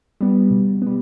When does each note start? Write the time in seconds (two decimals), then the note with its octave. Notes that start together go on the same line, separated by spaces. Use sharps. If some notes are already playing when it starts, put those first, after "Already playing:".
0.21 G3 B3
0.51 B2
0.82 G3 B3